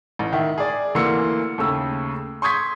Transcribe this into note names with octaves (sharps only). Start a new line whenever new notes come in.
A1
D#3 E5
G#4 D5
D2 E3 A#3 C6 E6 C#7
D#2 C#3 A3 E6
C6 C#6 D#6 G6 G#6 B6